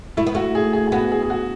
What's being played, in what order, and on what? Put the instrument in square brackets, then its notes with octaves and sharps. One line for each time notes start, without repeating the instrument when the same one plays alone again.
[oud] A3 [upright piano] E4
[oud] B3
[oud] A3 [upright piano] F#4
[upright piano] G#4
G#4
G#4
[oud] B3 [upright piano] F#4
[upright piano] G#4
G#4
F#4